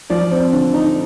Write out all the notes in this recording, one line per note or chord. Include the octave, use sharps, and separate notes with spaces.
F3 D5
C4
D3
D#4